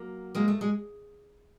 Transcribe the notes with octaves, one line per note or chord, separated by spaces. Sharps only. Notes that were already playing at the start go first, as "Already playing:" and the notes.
Already playing: F#3 A#3
G#3 A#3
A3
G#3